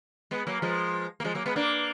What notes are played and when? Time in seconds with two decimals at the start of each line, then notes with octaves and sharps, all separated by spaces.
0.31 G#3 B3
0.47 F#3 A#3
0.62 F3 G#3
1.20 A#3
1.24 F3 G#3
1.35 F#3 A#3
1.46 G#3 B3
1.56 A#3 D4